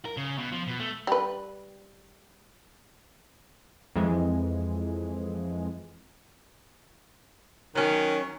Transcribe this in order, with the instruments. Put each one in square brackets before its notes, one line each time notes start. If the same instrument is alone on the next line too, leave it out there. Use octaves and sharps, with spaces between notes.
[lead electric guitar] A#4
C#3
B2
F3
B2
A3
[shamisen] G3 B4
[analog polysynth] F2 E3 G#3
[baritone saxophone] D#3 [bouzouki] F#3 C#4